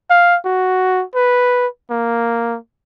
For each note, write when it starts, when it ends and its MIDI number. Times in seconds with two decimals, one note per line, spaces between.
0.10 0.37 77
0.45 1.04 66
1.15 1.67 71
1.90 2.57 58